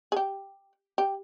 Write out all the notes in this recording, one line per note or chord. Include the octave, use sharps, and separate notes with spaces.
G4 G#4
G4